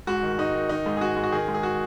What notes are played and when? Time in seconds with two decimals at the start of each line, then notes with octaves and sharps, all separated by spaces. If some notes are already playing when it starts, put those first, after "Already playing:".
0.07 G#2 F#4
0.23 D#3
0.38 G#2 D#4
0.55 D#3
0.69 D#3 D#4
0.86 G#2
0.97 G#4
1.01 G#2 F#4
1.17 G#2
1.23 F#4
1.32 D#3 G#4
1.48 G#2
1.54 G#4
1.63 F#4